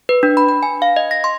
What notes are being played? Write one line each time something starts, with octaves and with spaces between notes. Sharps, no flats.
B4
D4
B5
B5
G#5
F5
D#5
A#6
C6